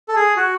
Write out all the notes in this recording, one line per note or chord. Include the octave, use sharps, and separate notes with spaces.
A4
G#4
F#4